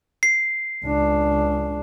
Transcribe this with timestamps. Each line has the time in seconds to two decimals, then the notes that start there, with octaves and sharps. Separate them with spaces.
0.23 C7
0.84 C#2 D4